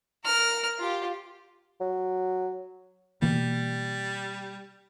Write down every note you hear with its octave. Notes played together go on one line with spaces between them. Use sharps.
A#4 F6
F4 G4
F#3
B2 E3 G3 A#3